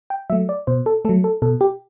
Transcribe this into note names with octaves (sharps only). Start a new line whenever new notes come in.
G5
F#3 A3 E5
D5
B2 C5
A4
F#3 A3 A4
A4
B2 A4
G4